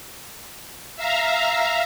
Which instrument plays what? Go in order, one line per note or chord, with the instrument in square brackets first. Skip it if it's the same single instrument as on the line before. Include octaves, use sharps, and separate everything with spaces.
[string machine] E5 F5 A#5